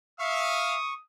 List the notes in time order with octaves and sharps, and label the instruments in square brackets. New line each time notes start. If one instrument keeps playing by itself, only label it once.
[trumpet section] E5 F5 [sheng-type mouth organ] C#6 [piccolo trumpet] D#6